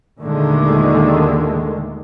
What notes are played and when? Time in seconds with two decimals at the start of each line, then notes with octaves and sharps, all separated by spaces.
0.22 D#2 A#2 D3 D#3 G#3 A3